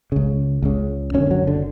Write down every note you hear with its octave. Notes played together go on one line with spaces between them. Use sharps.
C#2 C#3
C#2 C#3
F#1 F#2 D3 C#4
F#3
D3